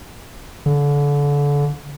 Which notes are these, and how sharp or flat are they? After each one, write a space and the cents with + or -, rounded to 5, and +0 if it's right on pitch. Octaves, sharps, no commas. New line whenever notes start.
D3 -30